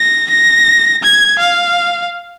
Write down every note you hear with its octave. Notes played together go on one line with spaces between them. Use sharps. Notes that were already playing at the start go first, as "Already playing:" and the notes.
Already playing: A#6
A#6
G#6
F5